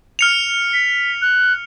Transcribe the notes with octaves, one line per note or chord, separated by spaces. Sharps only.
F6 C#7 F7
B6
F#6